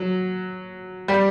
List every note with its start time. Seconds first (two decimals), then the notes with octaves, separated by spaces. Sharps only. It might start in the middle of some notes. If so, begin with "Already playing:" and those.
Already playing: F#3
1.08 G3